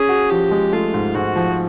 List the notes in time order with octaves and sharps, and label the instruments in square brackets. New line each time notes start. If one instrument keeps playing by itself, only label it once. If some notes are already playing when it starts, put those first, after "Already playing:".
Already playing: [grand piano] C#4 [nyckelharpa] G#4
[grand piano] F#4
[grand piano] F3 [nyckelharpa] G4
[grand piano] G#3
[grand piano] A3 [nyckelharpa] F4
[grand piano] G#2
[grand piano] G#2 [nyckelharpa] F#4
[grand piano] F3